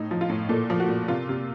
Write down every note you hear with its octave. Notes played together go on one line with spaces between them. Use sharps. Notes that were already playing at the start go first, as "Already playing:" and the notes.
Already playing: A2 D#4
F3
F4
A2
A#2 A4
F3
F#4
A#2
C3 F4
C3